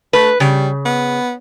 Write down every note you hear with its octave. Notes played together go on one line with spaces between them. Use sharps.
A3 B4
C#3 G3
B3